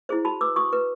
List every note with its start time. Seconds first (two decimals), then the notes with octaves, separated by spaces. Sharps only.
0.09 E4 G#4 C5
0.25 F#4 A5 B5
0.41 B4 D6 E6
0.56 F#4 C#6 D#6
0.73 B4